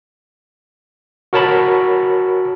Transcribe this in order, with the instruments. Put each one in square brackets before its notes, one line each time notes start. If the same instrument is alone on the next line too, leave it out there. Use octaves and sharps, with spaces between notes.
[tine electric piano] F#4 A#4 C#5 A5 B5